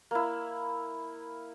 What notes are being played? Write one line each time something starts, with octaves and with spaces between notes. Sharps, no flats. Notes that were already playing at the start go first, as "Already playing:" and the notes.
A#3 E4